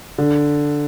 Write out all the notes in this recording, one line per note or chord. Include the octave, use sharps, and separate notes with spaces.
D3